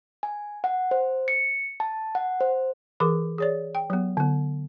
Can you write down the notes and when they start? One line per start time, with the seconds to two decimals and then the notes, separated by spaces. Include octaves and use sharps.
0.23 G#5
0.64 F#5
0.91 C5
1.28 C#7
1.80 A5
2.15 F#5
2.41 C5
3.00 E3 G#4 A#4 D6
3.38 G#4 C#5 D5
3.75 G5
3.90 F#3 B3
4.17 D3 B3